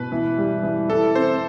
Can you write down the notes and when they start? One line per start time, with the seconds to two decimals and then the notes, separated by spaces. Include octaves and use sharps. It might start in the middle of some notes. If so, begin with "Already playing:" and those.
Already playing: B2 B4
0.12 E3
0.38 G3
0.63 E3
0.89 E3 A4
1.15 C4 C5